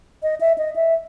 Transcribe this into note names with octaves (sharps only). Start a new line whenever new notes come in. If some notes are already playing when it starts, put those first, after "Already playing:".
D#5
E5
D#5
E5